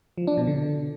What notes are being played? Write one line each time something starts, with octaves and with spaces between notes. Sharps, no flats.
F3
D4
B2
D3